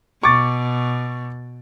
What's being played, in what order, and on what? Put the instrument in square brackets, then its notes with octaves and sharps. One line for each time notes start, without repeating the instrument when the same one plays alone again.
[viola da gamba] B2 [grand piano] C#6 D6 A6